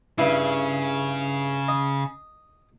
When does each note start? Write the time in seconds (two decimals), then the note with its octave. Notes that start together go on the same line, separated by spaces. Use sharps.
0.18 G2 C#3 E4
1.68 D#5